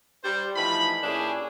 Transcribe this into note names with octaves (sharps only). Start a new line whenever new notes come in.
G3 C5
A2 E3 F3 D#4 B5
A#2 C#4 D4 E4 G4 G#4